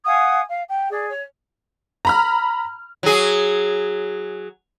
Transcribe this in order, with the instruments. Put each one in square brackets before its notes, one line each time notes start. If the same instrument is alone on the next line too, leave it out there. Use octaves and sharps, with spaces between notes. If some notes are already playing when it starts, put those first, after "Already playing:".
[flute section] F5 F#5 G#5 D#6
F5
G5
G#4 D5
C#5
[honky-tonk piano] A#5 B5 F6
[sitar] F#3 G#4